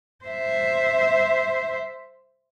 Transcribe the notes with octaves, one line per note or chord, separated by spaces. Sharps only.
C5 E5